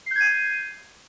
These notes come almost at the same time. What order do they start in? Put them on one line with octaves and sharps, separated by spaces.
C7 G6 G#6 D#7